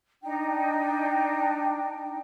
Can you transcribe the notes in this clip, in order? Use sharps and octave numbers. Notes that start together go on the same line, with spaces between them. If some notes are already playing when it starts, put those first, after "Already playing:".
D4 D#4 G5